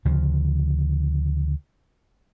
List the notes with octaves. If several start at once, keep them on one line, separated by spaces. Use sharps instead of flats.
D2 C#3 F3